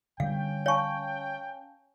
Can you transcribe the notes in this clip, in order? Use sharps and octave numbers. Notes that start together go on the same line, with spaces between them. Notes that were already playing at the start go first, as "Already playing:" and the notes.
D3 G3 C#4 F5 G5
C#5 F5 G#5 A5 C#6